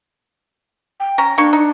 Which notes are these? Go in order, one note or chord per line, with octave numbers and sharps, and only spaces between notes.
G5
C#4 A#5
A#3 D4 C#6
D#4